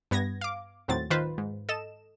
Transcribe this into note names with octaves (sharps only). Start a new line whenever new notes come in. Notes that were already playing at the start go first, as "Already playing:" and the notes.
G2 B3 G#6 A#6
F5 D6
D#2 A2 F#3 C4 A6
D#3 F4 B4 C5
G#2
A4 D#5 E7